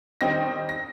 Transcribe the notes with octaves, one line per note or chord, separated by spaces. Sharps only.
D#3 G3 C4 D#4 A#6
A#6